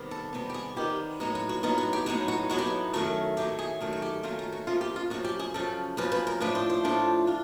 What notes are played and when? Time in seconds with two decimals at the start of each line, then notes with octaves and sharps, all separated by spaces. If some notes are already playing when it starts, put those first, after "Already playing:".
Already playing: C3 D#3 G3 B3
0.11 A4
0.33 C3 D#3 G3 B3
0.50 G4
0.54 G#4
0.76 C3 D#3 G3 B3 G4
1.20 A2 F#3 B3 D#4 F#4
1.35 F#4
1.49 F#4
1.63 A2 F#3 B3 D#4 F4
1.78 F#4
1.93 G4
2.06 A2 F#3 B3 D#4 F#4
2.28 F#4
2.50 A2 F#3 B3 D#4 F#4
2.58 G4
2.67 F#4
2.93 F#2 D#3 F#3 A3 F#4
3.37 F#2 D#3 F#3 A3 G4
3.59 G#4
3.80 F#2 D#3 F#3 A3
3.93 F#4
4.02 G4
4.23 F#2 D#3 F#3 A3 F4
4.39 F4
4.52 F#4
4.67 F#2 C#3 F3 F4
4.81 G4
4.96 F4
5.10 F#2 C#3 F3 F#4
5.24 G4
5.39 G#4
5.54 F#2 C#3 F3 A4
5.97 F#2 C#3 F3 B4
6.12 B4
6.27 A#4
6.40 A2 F3 A3 D4 F4 B4
6.55 C5
6.70 C5
6.83 A2 F3 A3 D4 F4
7.27 D4 F4